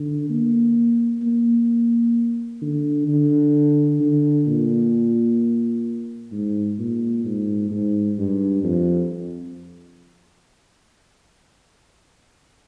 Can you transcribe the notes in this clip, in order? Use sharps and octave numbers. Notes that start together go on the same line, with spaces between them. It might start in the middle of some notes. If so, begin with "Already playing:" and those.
Already playing: D3
A#3
A#3
D3
D3
D3
A#2
G#2
A#2
G#2
G#2
G2
F2